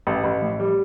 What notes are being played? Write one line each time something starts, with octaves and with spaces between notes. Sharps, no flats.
A1
A1
A2
G3